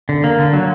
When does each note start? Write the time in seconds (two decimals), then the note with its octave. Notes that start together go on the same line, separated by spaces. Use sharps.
0.09 D3
0.24 A#3
0.39 D3
0.53 F#3